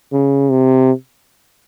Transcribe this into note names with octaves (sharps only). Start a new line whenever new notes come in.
C#3
C3